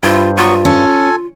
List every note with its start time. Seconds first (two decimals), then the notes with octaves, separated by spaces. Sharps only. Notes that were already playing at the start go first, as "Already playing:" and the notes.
0.03 G2 E4 F4 C5
0.37 F#3 B3 F4 C#6
0.65 C#4 A4 G#5